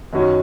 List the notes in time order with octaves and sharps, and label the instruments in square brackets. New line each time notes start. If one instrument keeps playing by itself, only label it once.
[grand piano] F#2 D#3 F#3 C#4